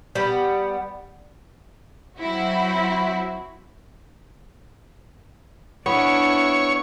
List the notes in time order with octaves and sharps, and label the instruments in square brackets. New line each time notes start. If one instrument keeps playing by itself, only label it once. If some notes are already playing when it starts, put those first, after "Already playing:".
[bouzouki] G3 B3
[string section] F#3 C4 E4 F#4
[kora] B3 [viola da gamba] D4 E4 [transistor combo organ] C#5